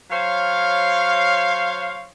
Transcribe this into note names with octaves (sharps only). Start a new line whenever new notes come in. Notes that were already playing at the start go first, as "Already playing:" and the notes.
F#3 C5 C#5 F5